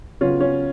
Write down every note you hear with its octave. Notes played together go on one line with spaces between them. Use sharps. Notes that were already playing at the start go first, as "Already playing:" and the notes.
C#3 F#3 B3 C#4 F4
C#4